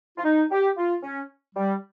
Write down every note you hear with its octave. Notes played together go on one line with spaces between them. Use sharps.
F4
D#4
G4
F4
C#4
G3